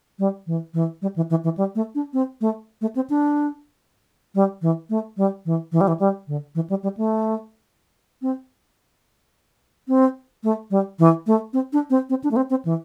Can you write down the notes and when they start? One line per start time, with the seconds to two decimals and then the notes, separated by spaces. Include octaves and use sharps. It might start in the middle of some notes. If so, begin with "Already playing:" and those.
0.19 G3
0.47 E3
0.74 E3
1.02 G3
1.16 E3
1.30 E3
1.44 E3
1.57 G3
1.75 A3
1.95 D4
2.13 C4
2.41 A3
2.81 A3
2.96 C4
3.10 D4
4.35 G3
4.62 E3
4.90 A3
5.17 G3
5.46 E3
5.72 E3
5.81 G3
5.88 E3
6.00 G3
6.28 D3
6.55 E3
6.70 G3
6.83 G3
6.97 A3
8.22 C4
9.88 C4
10.44 A3
10.71 G3
10.99 E3
11.27 A3
11.53 C4
11.73 D4
11.90 C4
12.10 C4
12.24 D4
12.31 A3
12.36 C4
12.50 C4
12.65 E3